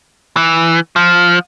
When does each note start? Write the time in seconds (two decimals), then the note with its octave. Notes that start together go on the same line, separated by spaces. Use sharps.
0.37 E3
0.96 F3